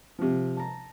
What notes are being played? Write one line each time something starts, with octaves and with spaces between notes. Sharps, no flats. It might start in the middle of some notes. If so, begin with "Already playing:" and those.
C3 F3
A5 A#5